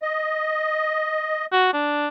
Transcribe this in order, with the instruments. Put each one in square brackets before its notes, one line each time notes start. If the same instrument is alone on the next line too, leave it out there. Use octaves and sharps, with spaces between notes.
[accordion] D#5
[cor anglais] F#4
D4